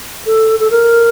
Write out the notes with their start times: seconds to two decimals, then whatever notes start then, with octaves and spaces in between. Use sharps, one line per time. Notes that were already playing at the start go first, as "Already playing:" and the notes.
0.26 A4
0.60 A4
0.71 A#4